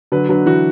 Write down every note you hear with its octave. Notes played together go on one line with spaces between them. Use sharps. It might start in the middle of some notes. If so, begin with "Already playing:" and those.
D3 F#3 B4
D3 F#3 B4
E3 F#4